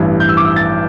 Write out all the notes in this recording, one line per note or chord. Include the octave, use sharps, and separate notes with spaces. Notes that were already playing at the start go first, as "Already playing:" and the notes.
Already playing: A1 G2 E3
G6
E6
D6
E6
A6